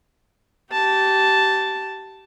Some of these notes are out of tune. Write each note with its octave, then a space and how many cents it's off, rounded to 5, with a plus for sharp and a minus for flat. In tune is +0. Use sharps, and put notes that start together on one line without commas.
G4 -25 A5 +0